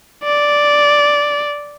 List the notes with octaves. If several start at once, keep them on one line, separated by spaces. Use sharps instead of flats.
D5